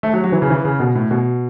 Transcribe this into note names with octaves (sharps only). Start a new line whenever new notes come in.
A3
F#3
F#3
E3
C#3
E3
C#3
B2
A2
B2